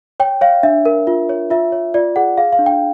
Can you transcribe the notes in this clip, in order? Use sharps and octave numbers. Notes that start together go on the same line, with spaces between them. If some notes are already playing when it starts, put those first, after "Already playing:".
C#5 G5
C#5 F5
D4 E5
A#4
F4
C#5
F4 E5
C#5
F4 D5
G#4 F#5
G#4 F5
F5
D4
G5